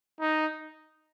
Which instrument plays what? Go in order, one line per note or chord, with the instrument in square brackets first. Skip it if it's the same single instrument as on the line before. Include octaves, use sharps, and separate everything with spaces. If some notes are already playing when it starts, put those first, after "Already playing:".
[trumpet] D#4